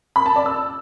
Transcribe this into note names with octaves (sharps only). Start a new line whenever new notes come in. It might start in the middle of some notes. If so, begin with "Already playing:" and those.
B5
A5
D5
E6